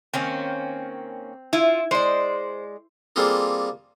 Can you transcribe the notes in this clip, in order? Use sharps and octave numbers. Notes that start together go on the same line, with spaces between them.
D#3 A#3 C4 C#4
E4 F4
G#3 C5 D5
G3 A#3 C4 F4 G#4 A4